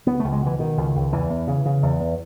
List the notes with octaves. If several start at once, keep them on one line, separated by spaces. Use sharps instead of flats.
C#2 B3
C#2 A3
G#3
B2
E3
B2 D#3
C#2
C#2
E2 E3
E2
C#3
C#3
E2
E2